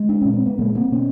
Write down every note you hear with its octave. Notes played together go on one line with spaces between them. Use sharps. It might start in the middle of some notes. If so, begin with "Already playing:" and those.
Already playing: G#3
D4
A#2 C#4
C4
B3
A#2 G#3 A#3
A#3 C4
B2 B3 C#4